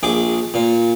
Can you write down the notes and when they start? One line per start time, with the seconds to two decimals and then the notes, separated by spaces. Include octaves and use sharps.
0.03 A#1 G#4 D6
0.54 A#2